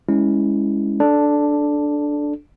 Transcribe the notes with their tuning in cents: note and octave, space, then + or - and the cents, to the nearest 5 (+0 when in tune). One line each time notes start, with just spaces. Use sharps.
G#3 +0 C#4 +0 E4 -10
D4 +0 A4 -15